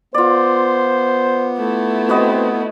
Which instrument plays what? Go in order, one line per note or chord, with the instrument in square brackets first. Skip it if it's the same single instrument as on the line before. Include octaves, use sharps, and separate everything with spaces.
[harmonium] B3 [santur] F4 D5 [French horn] C5
[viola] A3 E4
[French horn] C4 [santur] F#4 B4 D#5